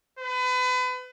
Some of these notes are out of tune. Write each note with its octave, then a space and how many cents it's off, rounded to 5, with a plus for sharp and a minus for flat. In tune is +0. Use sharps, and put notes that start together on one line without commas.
B4 +35